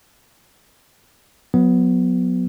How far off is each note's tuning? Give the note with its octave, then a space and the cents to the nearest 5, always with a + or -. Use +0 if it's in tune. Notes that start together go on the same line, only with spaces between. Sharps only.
F#3 -25 B3 +0